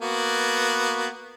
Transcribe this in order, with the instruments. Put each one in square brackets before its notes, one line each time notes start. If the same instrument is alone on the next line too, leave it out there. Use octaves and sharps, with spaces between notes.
[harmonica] A#3 B3 F#4